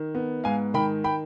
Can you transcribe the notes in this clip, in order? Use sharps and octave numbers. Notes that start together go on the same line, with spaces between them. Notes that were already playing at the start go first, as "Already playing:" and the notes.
Already playing: D#3
B3
G#2 F5 G#5
D#3 G5 B5
G5 B5